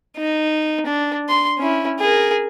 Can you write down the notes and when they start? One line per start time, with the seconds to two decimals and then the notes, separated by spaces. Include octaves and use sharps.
0.17 D#4
0.86 D4
1.29 C6
1.58 C#4 E4
2.00 G#4 A#4